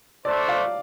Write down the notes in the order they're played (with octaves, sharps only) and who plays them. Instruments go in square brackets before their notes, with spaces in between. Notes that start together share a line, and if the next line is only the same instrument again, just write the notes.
[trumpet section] A3 D4 A4 C5 [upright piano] D5
[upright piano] D5 F5